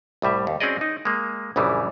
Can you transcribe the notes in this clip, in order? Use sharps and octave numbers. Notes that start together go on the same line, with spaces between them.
C2 A2 G3 E5
D#2
C4 C#4 F#4 G#4 D5 D#5
D#4
G#3 A#3
A#1 F#2 C#3 E3 G3